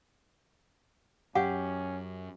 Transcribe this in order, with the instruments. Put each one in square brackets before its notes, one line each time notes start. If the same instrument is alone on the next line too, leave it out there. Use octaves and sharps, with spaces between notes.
[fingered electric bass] F#2 [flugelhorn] C#4 [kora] G4 [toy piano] F#5